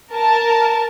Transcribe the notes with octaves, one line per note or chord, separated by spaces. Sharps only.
A#4 A5